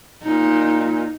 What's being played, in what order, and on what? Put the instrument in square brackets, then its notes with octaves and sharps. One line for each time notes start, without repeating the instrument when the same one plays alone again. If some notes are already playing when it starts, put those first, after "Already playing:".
[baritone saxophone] A#2 [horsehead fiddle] D#4